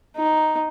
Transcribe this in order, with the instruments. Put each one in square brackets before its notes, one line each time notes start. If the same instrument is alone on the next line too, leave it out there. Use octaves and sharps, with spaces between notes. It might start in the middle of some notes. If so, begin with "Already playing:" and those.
[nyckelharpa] D#4